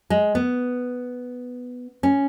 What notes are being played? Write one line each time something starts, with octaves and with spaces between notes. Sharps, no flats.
G#3
B3
C#4